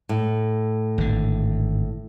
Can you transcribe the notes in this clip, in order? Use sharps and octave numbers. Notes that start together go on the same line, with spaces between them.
A2
G#1 D3